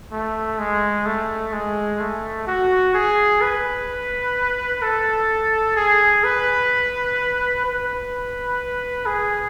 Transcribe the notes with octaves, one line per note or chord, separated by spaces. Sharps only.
A3
G#3
A3
G#3
A3
F#4
G#4
B4
A4
G#4
B4
B4
G#4